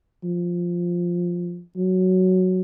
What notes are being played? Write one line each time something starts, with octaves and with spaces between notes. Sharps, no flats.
F3
F#3